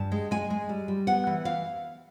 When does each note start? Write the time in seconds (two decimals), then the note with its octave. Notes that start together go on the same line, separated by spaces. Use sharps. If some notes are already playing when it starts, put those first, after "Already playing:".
Already playing: G2 A5
0.12 G#3
0.31 G#3 G#5
0.50 G#3
0.69 G3
0.88 G3
1.07 B3 F#5
1.27 E3
1.45 E3 F5